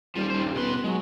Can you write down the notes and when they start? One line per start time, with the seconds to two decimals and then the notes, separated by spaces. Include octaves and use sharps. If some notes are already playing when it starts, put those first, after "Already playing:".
0.15 D#1 F3 G3
0.30 D#3 C5
0.43 G2
0.56 B2 B3 B4 C6
0.84 F#3 G#3